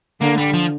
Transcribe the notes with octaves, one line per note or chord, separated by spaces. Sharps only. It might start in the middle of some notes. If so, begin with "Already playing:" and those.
D3 A#3
G3
F3